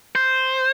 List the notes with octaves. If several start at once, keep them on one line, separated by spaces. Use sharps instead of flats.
C5